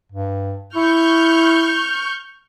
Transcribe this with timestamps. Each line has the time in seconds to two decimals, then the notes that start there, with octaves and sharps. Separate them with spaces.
0.12 G2
0.75 E4 C#6 F6 G6